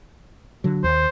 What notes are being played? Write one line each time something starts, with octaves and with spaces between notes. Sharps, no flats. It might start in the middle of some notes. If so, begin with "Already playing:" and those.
D3 F#3
D#2 C5